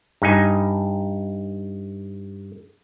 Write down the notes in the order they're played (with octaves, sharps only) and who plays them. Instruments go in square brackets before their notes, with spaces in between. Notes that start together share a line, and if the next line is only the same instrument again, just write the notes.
[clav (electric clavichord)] G2 D#4 G#5